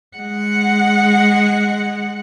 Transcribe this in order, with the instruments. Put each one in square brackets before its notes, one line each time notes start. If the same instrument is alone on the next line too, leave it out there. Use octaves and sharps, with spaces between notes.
[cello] G#3 F#5